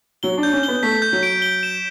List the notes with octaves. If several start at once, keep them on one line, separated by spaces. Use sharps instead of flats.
F#3 G7
D4
G6
C#4
G7
B3
A3 B6
G6
F#3
D7
G7
E7